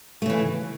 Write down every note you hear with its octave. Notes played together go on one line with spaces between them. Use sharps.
C#3 E3 A3